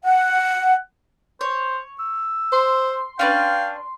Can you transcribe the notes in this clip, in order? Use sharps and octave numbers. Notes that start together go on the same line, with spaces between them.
F#5
C5 C#5
E6
C5 C6
C#4 D4 B4 F5 G5